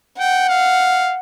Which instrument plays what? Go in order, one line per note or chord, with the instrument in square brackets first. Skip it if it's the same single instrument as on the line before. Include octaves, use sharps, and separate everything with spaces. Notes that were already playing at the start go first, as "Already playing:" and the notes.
[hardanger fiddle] F#5 [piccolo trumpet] G5
[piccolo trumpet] F5